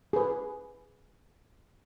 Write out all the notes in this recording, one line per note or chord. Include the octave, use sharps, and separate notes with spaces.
G#4 B4